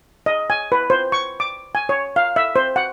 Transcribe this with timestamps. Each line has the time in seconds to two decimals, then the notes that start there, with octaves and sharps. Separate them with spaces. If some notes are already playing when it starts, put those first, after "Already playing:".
0.26 D#5
0.50 G#5
0.72 B4
0.90 C5
1.12 C#6
1.40 D6
1.75 G#5
1.89 C#5
2.16 F5
2.36 E5
2.56 C5
2.76 F#5